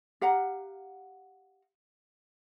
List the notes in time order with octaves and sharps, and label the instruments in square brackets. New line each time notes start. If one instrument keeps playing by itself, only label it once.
[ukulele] G4 F5 F#5 A#5